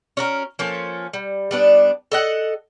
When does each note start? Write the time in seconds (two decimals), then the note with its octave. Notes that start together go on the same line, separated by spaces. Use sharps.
0.17 C#4 F#4 A#4
0.59 F3 A#3 C#4 A4
1.13 G3
1.51 G3 B3 D4
2.12 A4 D#5 F#5